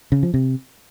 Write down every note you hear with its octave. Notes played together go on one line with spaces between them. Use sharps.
C#3
F3
C3